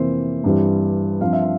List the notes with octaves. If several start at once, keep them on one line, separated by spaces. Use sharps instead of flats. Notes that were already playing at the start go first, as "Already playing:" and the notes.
Already playing: F2 C3 E3 A#3 C5 E5
G2 E3 G3 C4
G2 F3 C4 F5
E5
F5